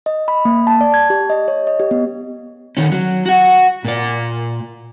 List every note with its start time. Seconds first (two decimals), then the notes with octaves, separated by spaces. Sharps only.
0.06 D#5
0.28 B5
0.45 A#3
0.67 A5
0.81 D5
0.94 G#6
1.10 G4
1.30 D#5
1.48 C#5
1.67 D#5
1.80 G4
1.91 B3
2.77 D#3 C#4
2.92 F#3
3.26 F#4 F#5
3.85 A#2 D5